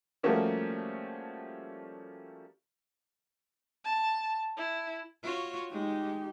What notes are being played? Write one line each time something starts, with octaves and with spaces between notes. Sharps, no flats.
F3 G3 A3 A#3 C#4 F#4
A5
E4
F4 F#4 C#5
G#3 D#4 G4